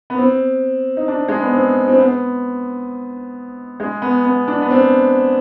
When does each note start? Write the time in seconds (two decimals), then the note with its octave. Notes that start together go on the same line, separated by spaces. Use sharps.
0.10 B3
0.18 C4
0.97 D#4
1.08 D4
1.28 G#3
1.41 B3
1.53 C4
1.88 C4
1.99 B3
3.80 G#3
4.02 B3
4.25 B3
4.48 D4
4.62 B3
4.70 C4